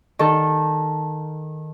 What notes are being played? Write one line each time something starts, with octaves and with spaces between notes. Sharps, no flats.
D#3 A4